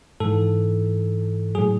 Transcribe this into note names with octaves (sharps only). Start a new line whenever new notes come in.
G#2 E3 A4
A2 F#3 G#4